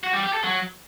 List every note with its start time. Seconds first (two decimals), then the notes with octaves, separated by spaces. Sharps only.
0.03 F#4
0.13 G3
0.23 G4
0.33 A4
0.43 F#3